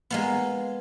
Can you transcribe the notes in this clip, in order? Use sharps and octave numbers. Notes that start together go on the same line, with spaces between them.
G#3 A#3 B3